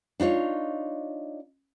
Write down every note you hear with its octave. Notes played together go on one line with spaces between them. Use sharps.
D4 D#4 F4 C#5